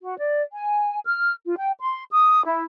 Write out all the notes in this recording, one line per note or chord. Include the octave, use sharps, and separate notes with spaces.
F#4
D5
G#5
F6
F4
G5
C6
D#6
E4